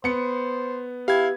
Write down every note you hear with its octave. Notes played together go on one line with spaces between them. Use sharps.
B3 C5 C#7
E4 G4 F5 G#6